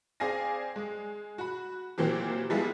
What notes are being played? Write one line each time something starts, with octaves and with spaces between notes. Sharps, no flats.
C4 G#4 D5 F5 G#5 A#6
G#3
F#4 B5
A#2 E3 F#3 A#3 C4 G4
F3 G3 G#3 B3 E4 F4